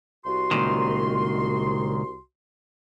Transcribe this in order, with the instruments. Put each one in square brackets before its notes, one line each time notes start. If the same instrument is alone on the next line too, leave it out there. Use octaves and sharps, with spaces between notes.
[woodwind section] C2 F#4 C6
[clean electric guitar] C#2 A#2 D#3